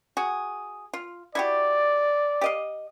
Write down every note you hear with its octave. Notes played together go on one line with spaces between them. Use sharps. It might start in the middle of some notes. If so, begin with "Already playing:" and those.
F#4 G#4
F4
E4 F#4 G4 D5
G4 D#5 F5